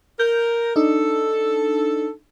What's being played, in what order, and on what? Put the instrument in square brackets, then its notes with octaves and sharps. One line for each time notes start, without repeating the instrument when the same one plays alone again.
[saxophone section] A#4 [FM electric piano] G6
[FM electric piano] D4 D#4 [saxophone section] A4